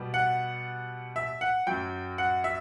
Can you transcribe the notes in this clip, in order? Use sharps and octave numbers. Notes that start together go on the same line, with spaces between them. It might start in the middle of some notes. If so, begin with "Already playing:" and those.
Already playing: B2 G3
F#5
E5
F#5
F#2 F#3 G5
F#5
E5